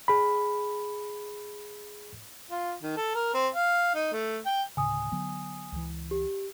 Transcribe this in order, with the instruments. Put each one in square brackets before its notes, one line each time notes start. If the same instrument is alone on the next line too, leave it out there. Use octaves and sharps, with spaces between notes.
[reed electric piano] G#4 B5
[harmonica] F4
D#3
A4
A#4
C4
F5
D#4
A3
G5
[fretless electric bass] D2 A2 C#3 [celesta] G#5 D#6
[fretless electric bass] D3 F#3 B3
C#2 E3
[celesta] G4